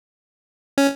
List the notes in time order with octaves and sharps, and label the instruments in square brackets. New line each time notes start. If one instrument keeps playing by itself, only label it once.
[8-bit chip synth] C#4